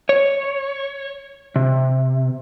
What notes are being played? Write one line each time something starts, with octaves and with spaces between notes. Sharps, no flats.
C#5
C3